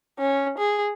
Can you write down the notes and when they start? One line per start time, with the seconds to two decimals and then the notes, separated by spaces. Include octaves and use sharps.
0.19 C#4
0.58 G#4